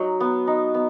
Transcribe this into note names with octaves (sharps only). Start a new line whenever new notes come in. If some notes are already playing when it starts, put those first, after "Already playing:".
Already playing: F#3 D#4
B3
D#4
B3